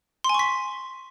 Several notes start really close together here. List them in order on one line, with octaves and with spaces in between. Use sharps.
C6 G#5 C#6 B6